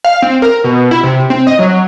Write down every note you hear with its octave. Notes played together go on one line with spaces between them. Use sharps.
F5
C4
A#4
B2
E4
C3
C4
D#5
F#3